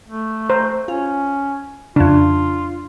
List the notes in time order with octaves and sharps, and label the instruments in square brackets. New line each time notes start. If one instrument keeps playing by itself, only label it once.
[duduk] A3
[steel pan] C5 [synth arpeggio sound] A#5
[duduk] C#4 [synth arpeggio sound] F4
[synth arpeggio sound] F2 C#3 [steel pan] D4 [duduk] F4